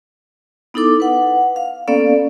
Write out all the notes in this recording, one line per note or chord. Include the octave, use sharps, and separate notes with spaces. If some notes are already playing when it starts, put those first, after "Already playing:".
B3 D#4 E4 A4 D6
B4 F#5
F5
A#3 B3 C#4 A4 D5 F5